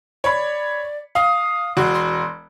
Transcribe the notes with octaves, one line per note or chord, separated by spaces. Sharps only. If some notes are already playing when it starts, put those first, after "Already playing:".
C#5 D5 B5
F5 D#6
E1 F#4 C6
C6